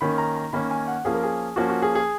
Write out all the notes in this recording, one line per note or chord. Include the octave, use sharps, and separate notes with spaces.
D#3 A#3 C#4 B5
A#5
A#5
D#3 A#3 C#4 B5
G#5
F#5
F3 A#3 C#4 G#4
A#4
G#4
F3 A#3 C#4 F#4
F#4
G#4
G#4